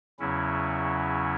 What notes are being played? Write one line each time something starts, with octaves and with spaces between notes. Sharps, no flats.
E2 C#3 F#3 C#4 E4